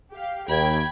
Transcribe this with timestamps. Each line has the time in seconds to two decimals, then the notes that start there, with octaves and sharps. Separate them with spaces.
0.12 G4 F5
0.48 D#2 G5 B5 G#6